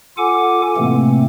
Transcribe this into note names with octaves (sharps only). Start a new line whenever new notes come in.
F4 A4 F#5 G#5 D6
A2 C3 E3 A3 A#3 C4